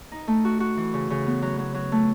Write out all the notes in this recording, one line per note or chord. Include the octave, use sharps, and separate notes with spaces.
D#4
A3
F#4
F#4
E3
C#3
C#3
B3
F#3
F#3
F#3
A3